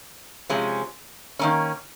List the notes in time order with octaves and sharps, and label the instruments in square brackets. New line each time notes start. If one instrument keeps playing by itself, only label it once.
[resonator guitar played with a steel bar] C3 F3 G#3 C#4
D#3 A#3 C#4